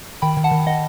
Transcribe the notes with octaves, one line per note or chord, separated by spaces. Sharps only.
D#3 G5 B5
D#3
F#5 A5
D#3
D#3 D#5 F#5